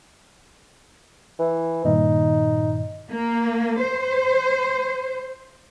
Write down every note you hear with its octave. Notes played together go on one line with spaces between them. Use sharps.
E3
G2 A#2 D#3 D#4
A#3
C5